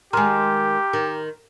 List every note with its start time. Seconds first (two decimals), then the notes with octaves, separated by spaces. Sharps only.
0.13 D#3 G#3 G4 A#5 C6 F6
0.93 D#3